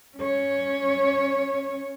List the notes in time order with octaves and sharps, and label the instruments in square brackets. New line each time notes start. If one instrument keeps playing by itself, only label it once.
[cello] C#4 C#5